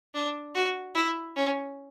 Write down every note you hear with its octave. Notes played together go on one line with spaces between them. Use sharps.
D4
F#4
E4
C#4